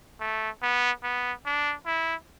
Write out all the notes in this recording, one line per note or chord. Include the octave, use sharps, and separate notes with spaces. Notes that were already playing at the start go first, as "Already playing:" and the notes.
A3
B3
B3
D4
E4